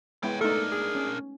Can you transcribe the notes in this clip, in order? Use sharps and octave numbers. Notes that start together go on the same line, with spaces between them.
G#3 B3 E4 C#5 G5
A3 D4 D#4 A4 A#4
G#4
C#4